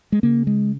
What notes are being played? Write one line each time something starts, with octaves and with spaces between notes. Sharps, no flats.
G#3
C#3 A#3
G#3